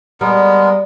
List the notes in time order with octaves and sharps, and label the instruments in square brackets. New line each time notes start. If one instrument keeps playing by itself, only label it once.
[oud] G3 [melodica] G#3 B3 A#4